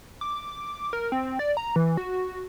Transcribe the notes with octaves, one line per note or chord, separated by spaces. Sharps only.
D6
A#4
C4
D5
A#5
E3
F#4